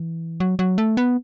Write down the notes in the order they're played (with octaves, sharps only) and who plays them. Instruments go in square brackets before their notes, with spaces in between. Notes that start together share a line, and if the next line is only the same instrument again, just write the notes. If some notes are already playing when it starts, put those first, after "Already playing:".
Already playing: [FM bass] E3
F#3
F#3
A3
B3